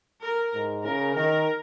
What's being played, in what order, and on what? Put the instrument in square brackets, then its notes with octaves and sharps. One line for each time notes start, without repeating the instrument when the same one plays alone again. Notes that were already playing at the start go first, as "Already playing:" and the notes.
[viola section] A#4
[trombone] G#2
[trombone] C#3 [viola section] A#4
[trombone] D#3 [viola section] A#4